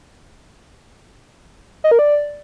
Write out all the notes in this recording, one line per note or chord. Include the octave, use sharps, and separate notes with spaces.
D#5
A#4
D5